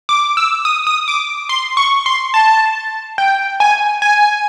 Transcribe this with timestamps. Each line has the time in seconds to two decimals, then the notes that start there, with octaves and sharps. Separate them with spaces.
0.09 D6
0.37 E6
0.65 D#6
0.87 D#6
1.08 D6
1.49 C6
1.77 C#6
2.06 C6
2.34 A5
3.18 G5
3.60 G#5
4.02 G#5